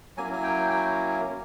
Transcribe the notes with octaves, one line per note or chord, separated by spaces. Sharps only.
F#3 A#3 C#4 E4 G#5
G#5
G5
G5